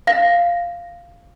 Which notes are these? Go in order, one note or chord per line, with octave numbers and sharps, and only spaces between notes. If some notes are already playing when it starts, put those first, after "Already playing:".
F5 A#6